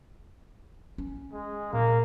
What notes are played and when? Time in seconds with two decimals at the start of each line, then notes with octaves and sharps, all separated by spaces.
0.98 C#4
1.32 G#3
1.73 A#2 A#3